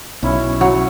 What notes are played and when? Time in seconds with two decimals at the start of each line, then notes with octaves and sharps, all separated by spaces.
0.23 B1 C#4 E4 C#5
0.61 F#3